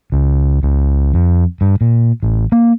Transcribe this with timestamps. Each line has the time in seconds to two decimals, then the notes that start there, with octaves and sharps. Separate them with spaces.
0.12 C#2
0.63 C#2
1.14 F2
1.61 G2
1.81 A#2
2.23 A1
2.52 A#3